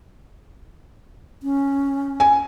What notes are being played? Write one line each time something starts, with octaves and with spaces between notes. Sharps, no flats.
C#4
G#5